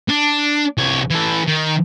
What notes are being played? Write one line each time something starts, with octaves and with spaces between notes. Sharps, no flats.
D4
C2 C#5
E3 A4
D#3